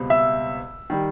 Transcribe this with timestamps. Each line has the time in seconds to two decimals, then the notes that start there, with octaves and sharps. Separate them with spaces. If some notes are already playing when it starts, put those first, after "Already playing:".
Already playing: C#2 B2 G3 C4
0.10 E5 E6
0.90 D#3 G3